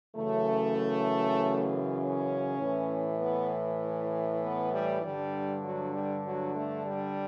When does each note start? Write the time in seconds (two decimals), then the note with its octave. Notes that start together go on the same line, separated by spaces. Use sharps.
0.16 F#2 C#3 E3 A3
1.99 C#4
2.59 A2 E3
3.20 B3
4.43 B3
4.72 G3
5.03 G2 D3 G3
5.64 F#3
5.94 G3
6.25 F#3
6.55 A3
6.86 G3